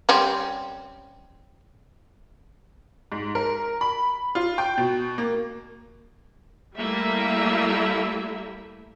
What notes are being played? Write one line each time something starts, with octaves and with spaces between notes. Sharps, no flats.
G3 C4 C#4
G#2
A#4
B5
F4
G5
B2
A#3
G3 A3 A#3 E4 E5